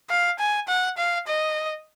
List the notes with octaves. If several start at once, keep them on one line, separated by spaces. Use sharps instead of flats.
F5
G#5
F#5
F5
D#5